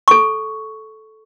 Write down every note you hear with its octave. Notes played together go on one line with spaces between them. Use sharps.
A4 C#6